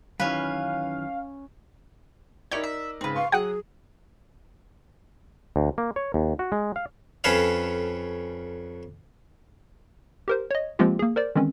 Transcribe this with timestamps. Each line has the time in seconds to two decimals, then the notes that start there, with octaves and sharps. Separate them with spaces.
0.20 F#2 D#3 E3 C#4 B4 F5
2.51 D#4 E4 G4 A#4 C#5 D5 G6 C#7
2.64 E5
3.01 G#2 C#3 C4 B4
3.16 F5 C6 C#6
3.32 F#3 G#4 F#5 G5 D#6 F#6
5.56 D2
5.78 A#3
5.96 C#5
6.14 D#2
6.39 F#4
6.52 G#3
6.76 F5
7.24 F2 C#4 A4 B4 C#5 F5
10.28 G4 A#4 C5
10.51 C#5 D#5
10.79 F3 G#3 A#3 C4 F4 G4
10.99 A#3 G#4
11.16 A#4 C5 D5
11.36 D#3 E3 G#3 C4 C#4